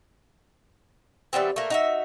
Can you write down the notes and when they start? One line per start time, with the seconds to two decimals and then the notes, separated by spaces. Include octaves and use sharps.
1.33 E3 G3 B3 C4
1.56 A3 A#3
1.70 D#4 F#4 E5